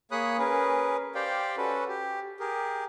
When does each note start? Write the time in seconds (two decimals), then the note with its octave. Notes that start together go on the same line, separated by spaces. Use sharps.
0.11 A#3 G#4 C#5 B5 D#6 F#6
0.38 C#4 G#4 A#4 B4
1.15 G4 C5 D5 F5 G5
1.57 C#4 F#4 A4 B4
1.88 G4
2.40 G4 G#4 A#4